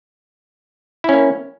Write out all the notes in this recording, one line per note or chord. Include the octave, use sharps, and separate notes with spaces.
A#3 C#4 E4